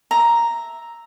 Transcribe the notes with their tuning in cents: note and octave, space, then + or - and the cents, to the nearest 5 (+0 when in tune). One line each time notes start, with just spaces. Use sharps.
E5 +0 A#5 +0